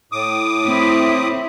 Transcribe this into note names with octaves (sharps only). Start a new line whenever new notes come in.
A2 D6 D#6
C4 E4